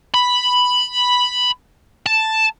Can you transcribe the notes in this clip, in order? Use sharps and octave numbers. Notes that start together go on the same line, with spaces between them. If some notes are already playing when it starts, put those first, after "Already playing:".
B5
A5